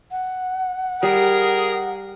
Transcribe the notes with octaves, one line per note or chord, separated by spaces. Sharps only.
F#5
G3 G#4 A#4